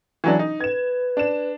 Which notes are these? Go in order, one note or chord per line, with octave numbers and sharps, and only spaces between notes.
E3 F#3 D4
D#4
B4 G#6 E7
D4 E7